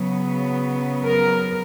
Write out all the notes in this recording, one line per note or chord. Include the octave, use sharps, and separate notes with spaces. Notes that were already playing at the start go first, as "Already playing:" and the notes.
Already playing: C#3 F#3 B3
A#4